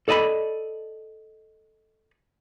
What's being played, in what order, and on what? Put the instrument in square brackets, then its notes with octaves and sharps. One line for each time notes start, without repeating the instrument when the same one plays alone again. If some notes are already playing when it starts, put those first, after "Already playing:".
[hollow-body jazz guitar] A4 D5 D#5 A5 B5